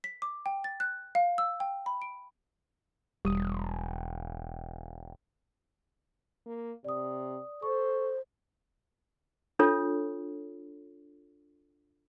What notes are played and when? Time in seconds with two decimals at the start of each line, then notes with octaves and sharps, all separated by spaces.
0.04 B6
0.22 D6
0.46 G5
0.64 A6
0.80 F#6
1.15 F5
1.38 E6
1.60 G5
1.86 B5
2.02 D7
3.25 E1 G3 D#6
6.46 A#3
6.84 C3 D5 D#6
7.62 A4 C5 C#6
9.59 D4 F4 A4 C#5